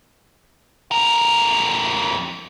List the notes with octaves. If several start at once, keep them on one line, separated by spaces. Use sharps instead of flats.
F2 A#4